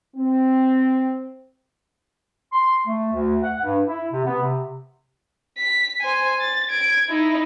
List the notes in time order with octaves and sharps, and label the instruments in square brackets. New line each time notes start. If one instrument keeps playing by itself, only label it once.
[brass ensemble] C4
[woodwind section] C6
A3
D2
F#5
G2
E4
C3
B3
C3
[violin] B6
C5 G#5
A6
G#6 D7
D#4 E4